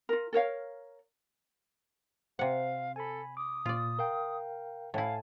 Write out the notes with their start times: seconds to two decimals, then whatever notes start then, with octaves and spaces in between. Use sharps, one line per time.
0.09 F4 A#4
0.33 A4 A#4 C#5 F5
2.39 C3 C5 F5 F#5
2.96 A4 G#5 B5
3.37 D6 D#6
3.66 A#2 F4 D5
3.99 A#4 F5 G5
4.94 A2 E4 F5 G#5 A5